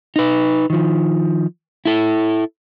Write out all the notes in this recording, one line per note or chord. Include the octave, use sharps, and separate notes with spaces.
D#4 B4
D#3 F3
E4 A4